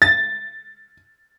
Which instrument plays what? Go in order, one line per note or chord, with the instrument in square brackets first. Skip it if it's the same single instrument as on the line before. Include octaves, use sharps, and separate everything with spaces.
[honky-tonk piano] A6